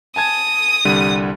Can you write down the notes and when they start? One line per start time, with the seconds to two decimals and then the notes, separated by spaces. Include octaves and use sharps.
0.16 G#5 A5 D#6 G#6
0.85 C2 D3 G3